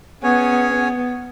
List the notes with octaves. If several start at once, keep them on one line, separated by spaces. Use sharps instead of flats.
B3 C#4 G#4 C#5 G#5
B3